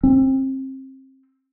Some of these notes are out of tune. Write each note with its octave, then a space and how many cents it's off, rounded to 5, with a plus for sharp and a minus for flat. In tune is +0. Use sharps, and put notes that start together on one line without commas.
C4 +30